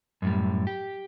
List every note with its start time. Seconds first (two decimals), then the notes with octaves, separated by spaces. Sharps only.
0.22 F#2 A2 G3
0.67 G4